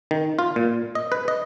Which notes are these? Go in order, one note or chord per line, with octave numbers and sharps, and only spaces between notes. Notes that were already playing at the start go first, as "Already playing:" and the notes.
D#3
F4
A#2
D#5
B4
D#5